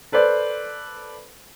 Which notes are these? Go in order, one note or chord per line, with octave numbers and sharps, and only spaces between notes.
A4 B4 C5 D5